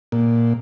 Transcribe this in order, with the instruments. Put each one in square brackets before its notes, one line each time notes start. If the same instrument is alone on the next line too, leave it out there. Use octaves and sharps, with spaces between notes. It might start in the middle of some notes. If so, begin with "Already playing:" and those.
[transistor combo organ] A#2